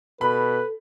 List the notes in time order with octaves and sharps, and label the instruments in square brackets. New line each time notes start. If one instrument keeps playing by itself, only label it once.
[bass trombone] B2 [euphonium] A4 [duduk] B4 [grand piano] B5